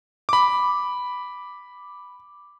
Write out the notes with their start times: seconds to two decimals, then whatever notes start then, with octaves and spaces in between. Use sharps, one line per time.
0.29 B5 D6